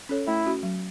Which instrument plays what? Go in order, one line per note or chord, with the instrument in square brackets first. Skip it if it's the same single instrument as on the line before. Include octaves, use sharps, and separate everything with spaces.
[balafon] C#4 A4 C#5
[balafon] A3 [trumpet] E4
[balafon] C#4 F#4
F#3